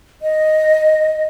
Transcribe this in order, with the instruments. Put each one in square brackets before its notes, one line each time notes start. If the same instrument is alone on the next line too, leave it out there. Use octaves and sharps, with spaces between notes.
[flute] D#5